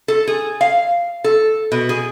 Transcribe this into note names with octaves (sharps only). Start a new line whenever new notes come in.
A4
G#4
F5
A4
B2
G#4